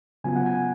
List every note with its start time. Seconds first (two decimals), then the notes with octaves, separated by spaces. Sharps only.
0.24 C#3 F#3 B3 F4 G#5
0.36 F#5
0.46 G#5